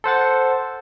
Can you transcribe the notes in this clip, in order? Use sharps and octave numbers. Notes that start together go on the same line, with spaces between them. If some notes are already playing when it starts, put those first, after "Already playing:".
A4 C5 F#5 A6